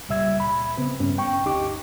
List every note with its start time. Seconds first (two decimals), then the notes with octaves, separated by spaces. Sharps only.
0.09 C#2 A#2 G3 E5 E6 G#6
0.40 B5
0.77 C#3 B3 C4
1.00 G2 C#4
1.18 G5 C#6
1.46 D2 D#4 G4 D6